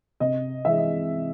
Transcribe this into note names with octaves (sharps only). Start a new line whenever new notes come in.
C3 D#5
E3 G#3 E5
D#5